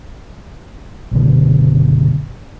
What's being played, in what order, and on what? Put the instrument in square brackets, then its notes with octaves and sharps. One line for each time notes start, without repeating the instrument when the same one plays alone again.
[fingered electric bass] F#1 B2 D3